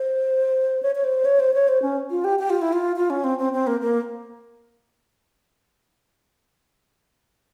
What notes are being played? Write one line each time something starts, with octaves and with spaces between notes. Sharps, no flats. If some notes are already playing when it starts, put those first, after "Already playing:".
Already playing: C5
C#5
C#5
C5
C#5
C5
C#5
C5
C#4
F4
G4
G4
F4
E4
F4
F4
C#4
C4
C4
C4
A#3
A#3